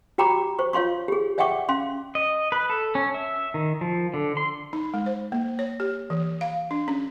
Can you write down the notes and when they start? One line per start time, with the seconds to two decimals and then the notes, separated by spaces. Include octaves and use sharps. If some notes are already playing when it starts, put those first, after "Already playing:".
0.18 F#4 G4 G5 A#5 B5 D6
0.59 C5 C#6
0.73 F4 C#5 F5 C6 C#6
1.08 G4 G#4
1.38 D5 E5 F#5 G5 C#6 D6
1.69 C#4 F5 C6
2.15 D#5
2.52 B4
2.70 A4
2.95 C#4
3.14 E5
3.54 D#3
3.81 F3
4.14 D3
4.37 C6
4.73 D#4
4.94 G#3
5.06 C5
5.32 A#3
5.59 C#5
5.80 G4
6.10 E3
6.41 F5
6.71 D4
6.88 C#4